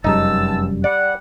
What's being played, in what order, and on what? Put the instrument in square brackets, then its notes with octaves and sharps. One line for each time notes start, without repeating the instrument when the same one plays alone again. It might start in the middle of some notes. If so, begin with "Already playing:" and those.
[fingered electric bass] F1 F#2 G3 [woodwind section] C#2 A5 E6 [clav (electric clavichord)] D#4
[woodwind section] G3 F#5 [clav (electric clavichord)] D5